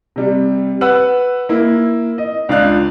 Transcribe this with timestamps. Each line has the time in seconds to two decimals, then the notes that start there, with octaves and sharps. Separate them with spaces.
0.16 C3 G3
0.81 B4 F#5 E6
1.49 A#3 E4
2.18 D#5
2.49 C#2 D4 F4 F5 F#6